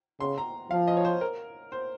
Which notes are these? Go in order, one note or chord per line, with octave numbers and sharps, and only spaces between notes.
C#3 C6
A#5
F3 F5
D#5
C#5
C5
A#4
C5